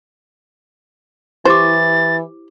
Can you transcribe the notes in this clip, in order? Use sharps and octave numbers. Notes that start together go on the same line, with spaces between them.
E3 E4 G4 C5 D6 A6